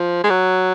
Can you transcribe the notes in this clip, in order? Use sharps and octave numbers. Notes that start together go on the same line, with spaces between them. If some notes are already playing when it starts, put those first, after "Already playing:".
Already playing: F3
G#3
F#3